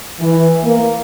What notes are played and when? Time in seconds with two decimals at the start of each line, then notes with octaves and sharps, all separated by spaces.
0.20 E3
0.64 A#3